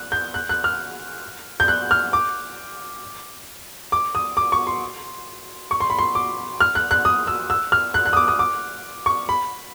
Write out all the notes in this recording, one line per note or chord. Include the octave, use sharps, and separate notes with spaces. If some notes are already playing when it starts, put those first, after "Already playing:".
Already playing: F#6
G6
F#6
F#6
F6
G6
F#6
F6
D6
D6
D#6
D6
C#6
C6
C#6
C6
B5
C6
D6
F6
F#6
F#6
D#6
E6
E6
F6
F#6
F#6
D#6
D6
D#6
D6
C#6
B5